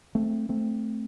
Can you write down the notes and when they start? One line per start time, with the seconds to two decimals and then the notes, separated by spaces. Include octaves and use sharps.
0.15 A3 C4
0.49 A3 C4